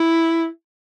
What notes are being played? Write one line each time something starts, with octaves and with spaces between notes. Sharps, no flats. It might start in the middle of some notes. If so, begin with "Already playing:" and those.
Already playing: E4